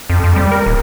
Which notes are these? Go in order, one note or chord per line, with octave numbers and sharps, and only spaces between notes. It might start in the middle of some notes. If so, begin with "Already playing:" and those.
F2
F2
G3
A#4
D#1